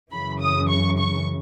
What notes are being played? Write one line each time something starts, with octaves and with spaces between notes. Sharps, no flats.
F#2 C#3 E3 B5
D#6
C#6
C#6